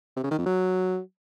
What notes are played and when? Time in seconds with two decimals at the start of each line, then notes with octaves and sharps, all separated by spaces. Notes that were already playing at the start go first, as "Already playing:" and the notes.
0.17 C3
0.24 C#3
0.31 D#3
0.38 F2
0.46 F#3